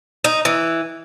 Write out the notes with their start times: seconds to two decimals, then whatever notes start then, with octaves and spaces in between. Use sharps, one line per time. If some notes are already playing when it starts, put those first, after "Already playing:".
0.24 D#4
0.45 E3